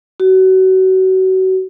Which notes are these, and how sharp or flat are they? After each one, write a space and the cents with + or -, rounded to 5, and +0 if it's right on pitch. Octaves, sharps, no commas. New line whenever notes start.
F#4 +30